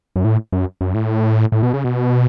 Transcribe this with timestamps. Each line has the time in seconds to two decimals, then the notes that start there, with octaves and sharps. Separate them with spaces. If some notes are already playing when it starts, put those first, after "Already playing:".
0.16 F#2
0.24 A2
0.52 F#2
0.81 F#2
0.94 A2
1.52 A2
1.63 B2
1.74 C#3
1.84 B2